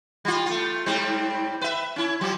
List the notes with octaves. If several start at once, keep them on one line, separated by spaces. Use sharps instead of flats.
G3 F4
A3 F4
G#2 G3 C4
B4 E5
C#4 E4
F3 F#3